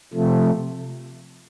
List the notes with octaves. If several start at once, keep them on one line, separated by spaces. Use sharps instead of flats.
C3 F3 A3